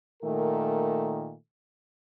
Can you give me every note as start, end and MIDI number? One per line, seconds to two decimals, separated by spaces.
0.23 1.34 46
0.23 1.34 51
0.23 1.34 57
0.23 1.34 70